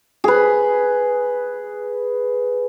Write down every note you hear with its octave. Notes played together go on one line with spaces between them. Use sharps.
G#4 B4